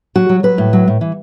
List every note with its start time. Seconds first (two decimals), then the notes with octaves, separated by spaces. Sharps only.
0.15 F#3 F#4
0.29 F#3
0.43 F#3 B4
0.58 A2
0.73 F#3
0.88 A2
1.01 E3